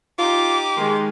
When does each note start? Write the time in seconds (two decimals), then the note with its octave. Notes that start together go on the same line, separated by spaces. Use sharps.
0.19 D#4 F4 G4 D6
0.77 D#3 G#3 C6